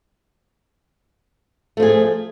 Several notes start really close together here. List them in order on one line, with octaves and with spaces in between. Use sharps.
A3 F3 G#4